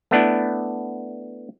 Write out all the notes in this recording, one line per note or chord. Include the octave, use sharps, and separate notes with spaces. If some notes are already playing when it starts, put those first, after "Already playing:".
A3 B3 D4 E4